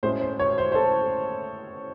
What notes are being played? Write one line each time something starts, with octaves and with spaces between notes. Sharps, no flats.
A2 G#3 C#4 C5
C5
C#5
C5
C5
A4